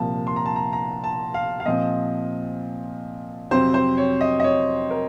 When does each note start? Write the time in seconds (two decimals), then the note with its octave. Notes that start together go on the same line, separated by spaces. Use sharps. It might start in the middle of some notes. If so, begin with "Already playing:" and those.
Already playing: C2 A#2 F3 A#3 A5
0.27 C6
0.36 A#5
0.46 A5
0.56 A#5
0.73 A#5
1.04 A5
1.34 F5
1.60 F5
1.66 A#2 F3 C4 D#5
3.51 F2 C3 F#3 C4 C5
3.74 C5
3.97 C#5
4.21 D#5
4.40 D#5
4.44 C#5
4.91 A#4